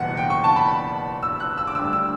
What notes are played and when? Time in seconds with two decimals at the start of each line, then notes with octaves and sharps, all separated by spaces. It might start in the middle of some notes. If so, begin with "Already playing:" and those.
Already playing: F#1 E2 B2 G3 F#5
0.17 G5
0.30 C#6
0.44 A5
0.56 B5
1.23 E6
1.40 F#6
1.58 E6
1.67 D6
1.75 D2 D3 G3 E6
1.93 E6